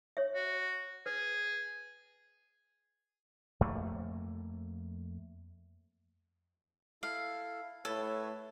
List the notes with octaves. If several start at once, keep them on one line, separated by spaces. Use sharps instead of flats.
C#5 E5
F#4
G#4 B4
F2 A3 A#3
E4 A4 F5
A2 A4 B4 C#5 E5